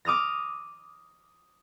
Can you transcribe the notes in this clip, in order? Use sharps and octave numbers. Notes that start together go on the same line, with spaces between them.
D6 D#6 F6 A#6